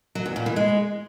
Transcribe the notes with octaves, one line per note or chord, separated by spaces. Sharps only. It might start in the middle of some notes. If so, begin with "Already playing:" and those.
F#3
E2
A#2
E3
G#3